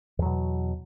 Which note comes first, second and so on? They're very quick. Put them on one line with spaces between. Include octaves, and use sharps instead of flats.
E2 F#3 B2